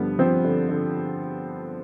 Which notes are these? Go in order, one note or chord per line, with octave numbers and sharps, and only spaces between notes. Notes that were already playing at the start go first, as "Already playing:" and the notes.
Already playing: G2 D3 F3 B3
F3 C4
D3
D3